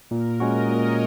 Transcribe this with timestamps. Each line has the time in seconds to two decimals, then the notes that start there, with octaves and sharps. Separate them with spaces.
0.11 A#2 A#4
0.40 G#3 C#4 F#4 D#5
0.69 A#2 C#5